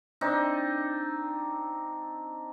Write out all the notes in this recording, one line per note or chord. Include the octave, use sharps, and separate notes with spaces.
C4 D4 D#4